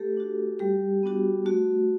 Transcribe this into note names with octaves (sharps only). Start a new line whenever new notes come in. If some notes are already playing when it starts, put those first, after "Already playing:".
Already playing: A3 G4 A4
D4 F#4
G3 G4
B3 D4 F#4
A3 F#4